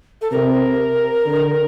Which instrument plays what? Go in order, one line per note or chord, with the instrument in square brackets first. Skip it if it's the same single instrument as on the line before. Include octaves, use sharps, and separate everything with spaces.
[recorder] A4
[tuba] C3 [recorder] A#4
[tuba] D3